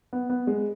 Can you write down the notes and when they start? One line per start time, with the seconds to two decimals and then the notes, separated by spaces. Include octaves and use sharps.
0.13 B3
0.30 B3
0.47 G#3